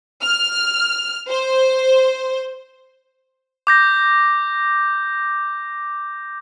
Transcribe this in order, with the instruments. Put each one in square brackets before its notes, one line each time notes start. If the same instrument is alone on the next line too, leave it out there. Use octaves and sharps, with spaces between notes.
[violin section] F6
C5
[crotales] D6 G6 A#6